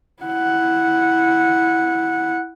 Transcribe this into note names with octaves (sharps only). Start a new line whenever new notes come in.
E4 F#5